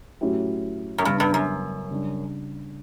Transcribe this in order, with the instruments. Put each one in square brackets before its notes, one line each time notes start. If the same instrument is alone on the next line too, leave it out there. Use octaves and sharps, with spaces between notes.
[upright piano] A2 F#3 C#4 E4 G4
[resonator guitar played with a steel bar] F#2
[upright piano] E2 C#3 G3 B3 [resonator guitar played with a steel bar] G2
[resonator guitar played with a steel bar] G2
F#2
[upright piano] C#3 G3 D4